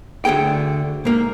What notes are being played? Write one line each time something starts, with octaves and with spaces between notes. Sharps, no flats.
D2 D3 G#4 G5
G#2 A#3